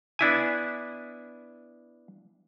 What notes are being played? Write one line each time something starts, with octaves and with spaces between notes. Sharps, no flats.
B3 D4 E4 G#5